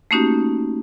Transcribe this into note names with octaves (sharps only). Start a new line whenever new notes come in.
A3 A#3 C#4 D#4 F#4 G4